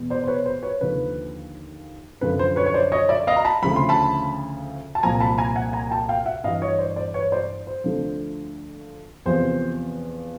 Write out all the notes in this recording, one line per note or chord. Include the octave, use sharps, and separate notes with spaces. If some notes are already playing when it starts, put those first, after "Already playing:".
Already playing: E2 B2
C5 D5
C5
B4 C#5
C5
B4 C#5
D#2 D3 F3 B4
F#2 D3 F3 B4
C5
B4 C#5
C#5
C5 D5
C#5 D#5
D5 E5
D#5 F5
A#5
A5 B5
D2 C#3 F3 B5
C6
A5 B5
A5
C2 A#2 F3 G#5 A#5
A5 B5
G#5 A#5
F#5 G#5
G#5 A#5
G5 A5
F5 G5
E5 F#5
G2 E3 D#5 F5
C#5 D#5
C5 D5
C5 D5
B4 C#5
C5 D5
C5
D2 D3 F3
E2 C3 F3 C5